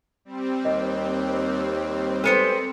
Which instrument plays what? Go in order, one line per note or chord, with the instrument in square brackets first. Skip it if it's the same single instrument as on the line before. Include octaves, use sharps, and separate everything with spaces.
[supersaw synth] G3 C4
[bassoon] D#2 [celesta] D#5
[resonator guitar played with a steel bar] G#3 B3 C5 [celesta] A4 C#7